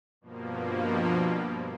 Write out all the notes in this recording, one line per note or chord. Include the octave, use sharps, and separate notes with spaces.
G2 B2 F3 A#3